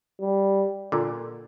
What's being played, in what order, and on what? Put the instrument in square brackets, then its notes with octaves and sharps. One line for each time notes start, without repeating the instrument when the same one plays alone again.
[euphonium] G3
[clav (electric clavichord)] A#2 D3